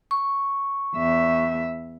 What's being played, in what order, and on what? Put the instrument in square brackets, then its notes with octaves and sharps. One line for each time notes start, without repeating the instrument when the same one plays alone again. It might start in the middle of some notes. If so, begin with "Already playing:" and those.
[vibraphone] C#6
[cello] E2 E5